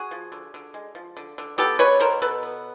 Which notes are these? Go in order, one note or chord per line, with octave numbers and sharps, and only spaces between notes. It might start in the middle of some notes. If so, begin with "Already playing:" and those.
Already playing: F#4 G#4
F3
D3
D3
G#3
F3
D3
D3
B3 G4 A4
G#3 B4 C#5
B2 A#4 C5
B2 A4 B4
B3